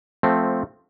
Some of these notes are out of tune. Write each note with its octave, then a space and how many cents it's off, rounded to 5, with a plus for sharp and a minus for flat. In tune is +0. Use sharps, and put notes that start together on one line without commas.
F3 +10 A3 +0 C4 +0